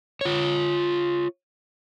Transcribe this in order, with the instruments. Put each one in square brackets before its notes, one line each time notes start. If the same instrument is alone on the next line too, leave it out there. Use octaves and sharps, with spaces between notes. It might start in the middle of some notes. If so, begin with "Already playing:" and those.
[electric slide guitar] F4 C#5